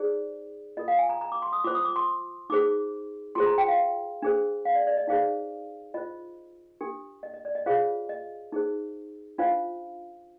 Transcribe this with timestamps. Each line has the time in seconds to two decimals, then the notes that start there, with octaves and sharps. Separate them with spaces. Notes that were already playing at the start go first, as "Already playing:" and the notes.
Already playing: D#4 G#4 C5 D5
0.77 F4 A#4 D#5
0.88 F5
0.99 G#5
1.09 A#5
1.21 A#5
1.32 D6
1.42 C6
1.53 D#6
1.64 F4 C5 D6
1.75 D#6
1.85 D6
1.96 C6
2.50 D#4 G#4 C5 D6
3.35 F4 G#4 C5 C6
3.46 A#5
3.58 G5
3.68 F5
4.22 D4 G#4 C5
4.65 F5
4.75 D5
4.87 D5
4.97 D#5
5.07 D#4 G#4 C5 F5
5.94 F4 C5 D#5
6.81 D4 G4 A#4
7.23 D#5
7.34 D#5
7.45 D5
7.55 D#5
7.66 F4 G#4 C5 F5
8.09 D#5
8.52 D#4 G#4 C5
9.38 D4 F4 C5 F5